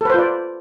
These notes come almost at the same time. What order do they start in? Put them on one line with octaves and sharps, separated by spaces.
A4 B4 C5 F4 D5